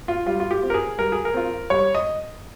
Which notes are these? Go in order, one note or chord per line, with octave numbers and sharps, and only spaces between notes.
F4
G3 F4
F4
G4
C4 F4
A#4
G#4
G3 A#4
G#4
A#4
C4 F4
G3 C#5
D#5